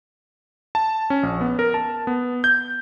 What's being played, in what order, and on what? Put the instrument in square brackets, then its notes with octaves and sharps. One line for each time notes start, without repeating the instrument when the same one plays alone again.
[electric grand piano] A5
C#4
A#1
B3
A#4
A5
B3
G6